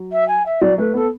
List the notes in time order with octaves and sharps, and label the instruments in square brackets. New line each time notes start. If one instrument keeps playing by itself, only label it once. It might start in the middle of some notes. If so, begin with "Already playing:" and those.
Already playing: [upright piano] F#3
[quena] E5
G#5
E5
[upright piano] F#3 [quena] D5
[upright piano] A3 [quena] B4
[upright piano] B3 [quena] A4